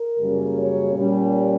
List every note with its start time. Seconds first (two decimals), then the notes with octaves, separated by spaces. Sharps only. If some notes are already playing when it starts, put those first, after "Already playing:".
Already playing: A#4
0.19 F#2 C#3 G3 A#3 C#4
0.56 C#5
0.94 A#2 G3 C#4